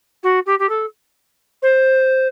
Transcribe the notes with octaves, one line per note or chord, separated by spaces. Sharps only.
F#4
G4
G4
A4
C5